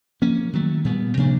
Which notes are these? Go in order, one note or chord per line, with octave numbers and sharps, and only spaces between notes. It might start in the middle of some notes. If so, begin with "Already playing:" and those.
F3 A#3 C#4
D#3 F#3 A3
A#2 G3 B3
C3 F3 A#3 D4